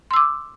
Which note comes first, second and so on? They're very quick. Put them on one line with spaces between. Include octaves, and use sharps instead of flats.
C6 E6 D6